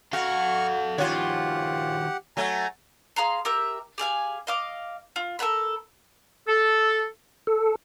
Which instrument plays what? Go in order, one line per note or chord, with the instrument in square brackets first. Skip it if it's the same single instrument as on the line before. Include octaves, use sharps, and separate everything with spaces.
[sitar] F#4 [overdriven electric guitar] A4 F5 [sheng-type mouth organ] C#6 F6
[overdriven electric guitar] D#3 F3 [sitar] F4 C#5 [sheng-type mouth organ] G4 F#5
[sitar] F#3 A3 [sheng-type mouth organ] G#5 A#5
[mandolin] G#4 F5 A#5 C6
G4 A#4 E5
G4 G#4 F5 G#5
D#5 F5 D6
F4
A4 A#4 F#5 B5
[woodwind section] A4
[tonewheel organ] A4